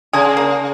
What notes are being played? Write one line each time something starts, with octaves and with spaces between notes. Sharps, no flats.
C#3 G#4
A#3